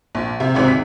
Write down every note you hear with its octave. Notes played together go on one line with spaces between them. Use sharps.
A#1
C3
G#1 C#2 G#2 C3
B6